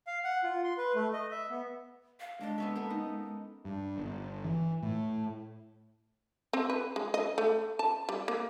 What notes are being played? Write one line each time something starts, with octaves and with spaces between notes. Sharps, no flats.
F5
F#5
F4
C6
B4
A3
D#5
E5
B3
F5
G#3 D4 D5
B3 C#4 E5
A#3 B3 A4
D#4
G2
G1
E3
A2
C4
B4
G#3
D#5
A3
A5
G3
A#3